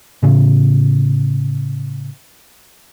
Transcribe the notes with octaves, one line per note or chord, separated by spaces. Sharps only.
A2 C#3